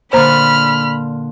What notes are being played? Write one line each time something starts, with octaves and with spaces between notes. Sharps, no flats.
A#2 D3 C5 A#5 B5 F6